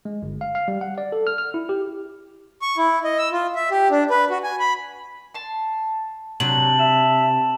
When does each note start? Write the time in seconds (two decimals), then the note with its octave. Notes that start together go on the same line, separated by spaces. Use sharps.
0.05 G#3
0.22 G1
0.41 F5
0.55 F5
0.68 G3
0.81 F#5
0.98 D5
1.12 A4
1.27 F6
1.38 F6
1.54 E4
1.69 G4
2.62 C#6
2.77 E4
3.04 D#5
3.19 E6
3.32 F4
3.55 E5
3.71 G4
3.91 D4
4.10 B4
4.30 F#4
4.44 G#5
4.60 B5
5.34 A5 C6
6.40 C3 F#3 D4 F#7
6.79 E5 E7